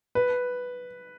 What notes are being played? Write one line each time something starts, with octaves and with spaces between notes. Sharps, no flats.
B4